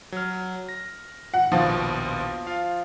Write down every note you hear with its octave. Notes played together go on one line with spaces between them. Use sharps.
F#3 F6
A#6
F#5
A#1 D#2 B2 F3
F4 F5